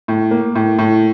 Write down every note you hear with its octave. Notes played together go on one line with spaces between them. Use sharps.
A2
A#3
A2
A2